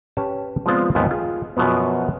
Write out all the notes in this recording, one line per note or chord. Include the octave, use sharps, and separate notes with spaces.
C#4 G4 B4 C#5 A5
F3 G#3 B3 C4 F4 D5
D#2 G#2 F3 A3 B3
F4 G#4
F#2 B2 F3 F#3 B3